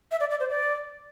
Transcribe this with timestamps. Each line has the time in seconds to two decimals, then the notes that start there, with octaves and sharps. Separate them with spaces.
0.11 E5
0.20 D5
0.31 D5
0.40 C5
0.50 D5